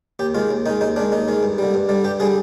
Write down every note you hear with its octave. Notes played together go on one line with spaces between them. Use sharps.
D#2 G4
D#3 G#3 F4
D#2
D#3 G#3 D#4
D#2 D#4
D#3 G#3 D4
D#2 D#4
D#3 G#3
G2
D3 G3
G2
D3 G3
G2 G4
D3 G3 G#4